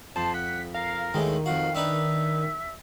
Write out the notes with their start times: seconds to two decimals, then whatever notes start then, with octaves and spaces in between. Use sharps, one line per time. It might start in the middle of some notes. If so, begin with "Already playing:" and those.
0.16 F2 C5 A5
0.34 F#5 B6
0.74 A#4 F5
1.14 D#2 A2 D#3 G#3
1.46 F2 F#4 F5
1.75 D4 D#4 B4 E5